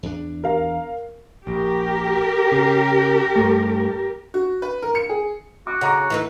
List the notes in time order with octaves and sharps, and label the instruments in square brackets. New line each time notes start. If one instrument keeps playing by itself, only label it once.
[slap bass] E2 D4
[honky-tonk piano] A#4 F5
[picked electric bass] A#1 [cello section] G4 A#4
[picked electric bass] C#3
G2 A3
[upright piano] F#4
B4
A#4
C#7
G#4
[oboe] F#4 [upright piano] D6
[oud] C#3 [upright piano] F#5 A#5 D6
[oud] E3 D#4 B4